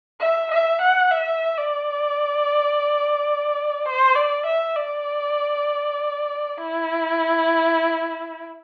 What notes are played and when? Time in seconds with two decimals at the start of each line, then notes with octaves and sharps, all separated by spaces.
0.21 E5
0.51 E5
0.81 F#5
1.11 E5
1.57 D5
3.85 C5
4.15 D5
4.45 E5
4.76 D5
6.58 E4